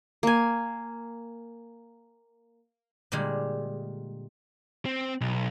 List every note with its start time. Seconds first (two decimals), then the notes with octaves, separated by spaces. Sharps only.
0.23 A#3 G#5
3.12 A#2 D3 G3 G#3
4.86 C4
5.21 B1